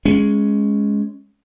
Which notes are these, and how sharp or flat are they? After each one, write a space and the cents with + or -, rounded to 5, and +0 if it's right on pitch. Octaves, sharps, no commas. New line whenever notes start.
G#3 +0 C#4 +0